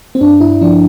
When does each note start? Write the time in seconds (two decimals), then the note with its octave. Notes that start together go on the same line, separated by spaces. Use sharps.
0.15 C4
0.21 G2 D4
0.40 G2 E4
0.61 F3 D4